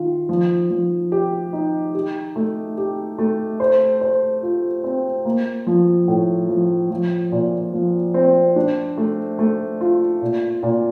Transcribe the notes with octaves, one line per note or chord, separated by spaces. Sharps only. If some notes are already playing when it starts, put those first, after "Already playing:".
Already playing: D#3 F4
F3
F3
G4
D#4
G4
A3
G4
A3
C5
C5
F4
C4
A#3
F3
A2
F3
F3
A#2
F3
C4
D4
A3
A3
F4
A#2
A#2